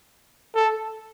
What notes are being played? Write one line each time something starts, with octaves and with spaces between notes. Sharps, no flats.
A4